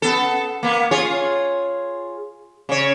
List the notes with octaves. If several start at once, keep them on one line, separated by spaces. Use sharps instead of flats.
B3 A4
A#3 B3
F4 G#4 C#5
C#3 C#5